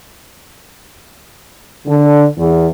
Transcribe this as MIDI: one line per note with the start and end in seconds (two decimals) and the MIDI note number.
1.87 2.25 50
2.37 2.66 40